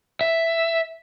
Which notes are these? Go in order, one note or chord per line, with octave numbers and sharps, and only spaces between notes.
E5